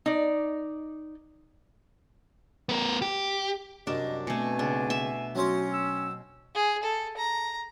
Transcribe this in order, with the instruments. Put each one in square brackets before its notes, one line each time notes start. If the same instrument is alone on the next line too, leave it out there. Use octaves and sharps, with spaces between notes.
[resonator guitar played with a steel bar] D#4 D5
[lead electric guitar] B3 A#4
G4
[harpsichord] C2 F#2 [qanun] D4 [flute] D#5
[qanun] B2 A3 [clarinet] C4 [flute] G#5
[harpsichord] C#2 [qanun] D4
[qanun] E5
[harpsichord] F#3 C4 C5 [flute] C#4 [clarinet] F#4
[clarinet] E6
[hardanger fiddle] G#4
A4
A#5